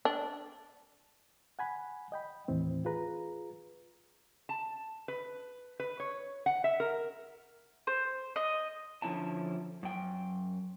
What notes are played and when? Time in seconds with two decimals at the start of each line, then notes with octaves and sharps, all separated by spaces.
0.05 D4
1.59 F#5 G#5 B5
2.12 D#5 G5 B5
2.48 D#2 A2 E3 C4
2.85 F4 G#4 B4 A#5
4.49 A5
5.08 B4
5.80 B4
6.00 C#5
6.46 F#5
6.64 E5
6.80 A#4
7.87 C5
8.36 D#5
9.02 D3 F3 C#4 E4 A5
9.83 F#2 G5